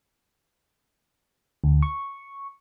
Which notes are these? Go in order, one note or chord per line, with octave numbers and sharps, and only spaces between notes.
D2
C#6